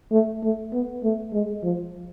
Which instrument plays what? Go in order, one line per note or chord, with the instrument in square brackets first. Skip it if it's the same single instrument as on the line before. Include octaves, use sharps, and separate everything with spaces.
[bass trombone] A3
A3
B3
A3
G#3
F3